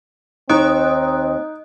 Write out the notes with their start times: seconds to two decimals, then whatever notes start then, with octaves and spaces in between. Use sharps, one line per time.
0.49 D#2 C4 D#4 D#5 D#6 F#6